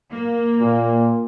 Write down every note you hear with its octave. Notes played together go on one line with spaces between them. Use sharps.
A#3
A#2